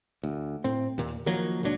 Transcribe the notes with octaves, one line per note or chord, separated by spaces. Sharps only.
D2
A2 C4
D#2 A#2
D#3 F3 F#3 A#3
C#2 A#2 F#3 D4